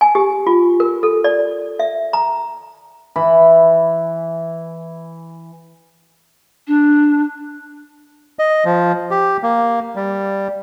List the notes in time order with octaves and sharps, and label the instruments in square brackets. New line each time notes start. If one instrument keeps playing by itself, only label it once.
[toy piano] G#5
G4
F4
A#4
A4
D5
E5
A#5
[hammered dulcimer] E3 B5
[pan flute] D4
[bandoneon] D#5
F3
G4
A#3
G3